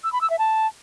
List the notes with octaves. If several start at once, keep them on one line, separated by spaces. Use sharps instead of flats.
E6
B5
E6
E5
A5